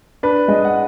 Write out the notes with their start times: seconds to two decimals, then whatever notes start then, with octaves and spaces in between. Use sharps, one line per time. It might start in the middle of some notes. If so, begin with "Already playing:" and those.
0.23 D4 B4
0.48 G#3 D#5
0.65 F#5